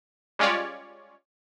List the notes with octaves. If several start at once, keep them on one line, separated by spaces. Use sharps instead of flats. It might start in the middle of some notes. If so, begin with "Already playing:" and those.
G3 G#3 C#4 F4 C#5 D5